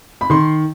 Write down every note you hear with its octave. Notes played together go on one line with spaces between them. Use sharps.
B5
D#3 C6